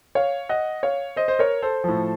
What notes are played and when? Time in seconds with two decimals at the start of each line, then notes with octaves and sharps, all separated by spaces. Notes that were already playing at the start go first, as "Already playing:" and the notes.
0.15 C#5 F5
0.49 D#5 F#5
0.83 C#5 F5
1.16 C5 D#5
1.28 C5
1.39 A#4 C#5
1.62 A4 C5
1.84 A2 F3